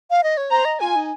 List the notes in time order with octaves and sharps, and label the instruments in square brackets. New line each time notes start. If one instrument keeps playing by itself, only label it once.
[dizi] F5
D#5
C#5
[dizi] C5 [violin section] A#5
[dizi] D#5
[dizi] F4 [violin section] G#5
[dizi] D#4